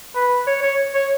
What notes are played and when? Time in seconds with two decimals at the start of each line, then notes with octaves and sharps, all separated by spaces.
0.15 B4
0.47 C#5
0.63 C#5
0.95 C#5